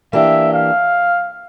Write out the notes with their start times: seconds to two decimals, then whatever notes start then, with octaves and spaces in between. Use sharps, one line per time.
0.13 E3 A#3 D4 G4 E5
0.54 F5